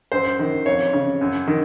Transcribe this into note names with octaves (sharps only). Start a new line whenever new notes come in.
F#2 C5
D#3
F2 C#5
C#3
F#2
D#3